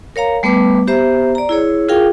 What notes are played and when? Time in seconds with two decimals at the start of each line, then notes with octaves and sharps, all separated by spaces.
0.16 A#4 C#5 F5 A#5
0.43 G3 A3 B3 B4 D6
0.87 B3 G4 C5 E5 A#5
1.35 D5 A#5
1.49 E4 G#4 C#5
1.88 F4 G#4 A#4 F5 G5